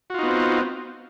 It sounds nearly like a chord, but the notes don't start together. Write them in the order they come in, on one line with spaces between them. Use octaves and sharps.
F#4 F4 D#4 B3 C4